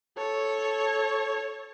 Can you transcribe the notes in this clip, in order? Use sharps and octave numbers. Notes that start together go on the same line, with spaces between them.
A4 C#5